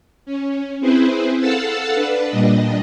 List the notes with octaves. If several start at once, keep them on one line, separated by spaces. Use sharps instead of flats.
C#4
C4 E4 G#4 B4 C5
A4 F5 F#5 A5 E6
D4 B4
A#2 G3 D4 D#5